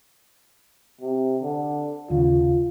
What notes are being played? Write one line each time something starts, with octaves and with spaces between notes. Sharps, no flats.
C3
D3
D#2 C#3 F4